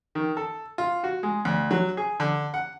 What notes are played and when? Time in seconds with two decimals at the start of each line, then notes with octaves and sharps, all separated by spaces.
0.15 D#3
0.37 A4
0.78 F4
1.04 F#4
1.23 G#3
1.45 D2
1.71 F#3
1.97 G#4
2.20 D3
2.54 F#5